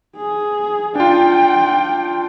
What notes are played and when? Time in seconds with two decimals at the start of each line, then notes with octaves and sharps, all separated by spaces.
0.16 G#4
0.95 D4 F4 G5